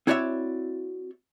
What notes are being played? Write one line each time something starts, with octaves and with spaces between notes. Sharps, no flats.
C4 E4 F#4 C#5 D5 E5